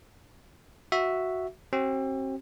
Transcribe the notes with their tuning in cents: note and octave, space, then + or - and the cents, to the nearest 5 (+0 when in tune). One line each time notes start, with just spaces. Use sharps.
F#4 +0 E5 +0
C4 +35 F#4 +45